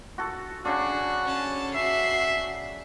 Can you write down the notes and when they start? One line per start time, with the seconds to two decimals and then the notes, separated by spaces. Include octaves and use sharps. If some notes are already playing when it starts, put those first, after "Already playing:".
0.18 F#4 A4
0.65 C#3 D4 F#4
1.25 C#4 A5
1.75 F#4 E5 C7